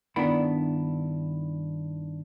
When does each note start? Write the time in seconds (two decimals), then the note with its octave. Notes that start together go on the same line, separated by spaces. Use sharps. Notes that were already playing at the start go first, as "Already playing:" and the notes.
0.16 G2 D#3 B3 D4 E4 B5